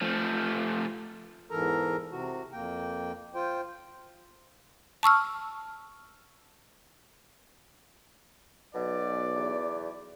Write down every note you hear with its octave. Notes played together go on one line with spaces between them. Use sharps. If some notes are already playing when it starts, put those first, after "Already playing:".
F3 A3
E2 G#2 E3 A4 A#4 A#5
C3 F#4
F2 A#3 G5
F4 C5 G5
A5 C#6 E6 F6
B1 B2 D5
E2